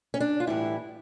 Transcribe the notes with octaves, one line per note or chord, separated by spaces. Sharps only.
C#4
D4
F4
A2 E3 G3 E4